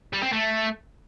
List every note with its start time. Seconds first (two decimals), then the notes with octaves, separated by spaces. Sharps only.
0.13 G3
0.23 C4
0.32 A3